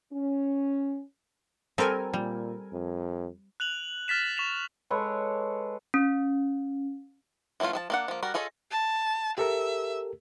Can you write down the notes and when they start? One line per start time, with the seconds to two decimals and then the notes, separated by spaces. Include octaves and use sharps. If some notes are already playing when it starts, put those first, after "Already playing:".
0.12 C#4
1.78 G3 C4 G4 A4 A#4 G#5
2.14 A#2 G3
2.73 F2
3.60 F#6 F7 F#7
4.08 F6 A6 B6 E7
4.37 C#6 B6 E7 F7
4.90 G#3 A4 B4 C#5
5.94 C#4
7.60 E3 F#3 A3 C#4 F4
7.73 F3 G#4 A5
7.90 A#3 D4 F#5
8.08 F3 A#3
8.23 G3 F#4 A#4
8.34 F4 G#4 A4 C#5 D#5
8.71 A5
9.38 G4 A4 A#4 E5